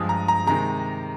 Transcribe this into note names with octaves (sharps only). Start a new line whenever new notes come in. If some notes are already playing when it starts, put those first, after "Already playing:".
Already playing: G2 F3 G#3 D#6
A#5
A#5
C3 D#3 G#3 A#5